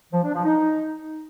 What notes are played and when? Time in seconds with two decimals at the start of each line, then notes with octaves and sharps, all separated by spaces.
0.12 F3
0.23 D4
0.34 F3
0.45 D#4